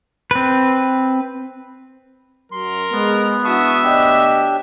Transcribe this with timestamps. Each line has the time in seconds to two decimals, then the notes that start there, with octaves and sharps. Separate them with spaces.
0.31 C4 B4
2.52 F#2 F#3 A#4 C6
2.92 G#3 B3
3.45 D4 E4 F#4 E5 A5 C#6 D#6
3.84 D2 D4 G4 C#5 D#5